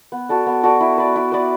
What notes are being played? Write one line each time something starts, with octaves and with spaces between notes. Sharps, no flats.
B3
F#4 A4 D5
B3
F#4 A4 D5
E4
B4 D5
E4
B4 D5